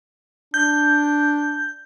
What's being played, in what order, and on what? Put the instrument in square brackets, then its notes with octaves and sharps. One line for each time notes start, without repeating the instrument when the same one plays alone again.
[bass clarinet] D4 [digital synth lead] G6